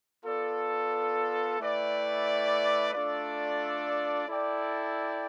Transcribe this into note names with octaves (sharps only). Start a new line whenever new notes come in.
B3 F4 A4 D5
A3 E4 B4 D5 G5
A3 D4 F4 A4 D5
E4 A4 D5 G5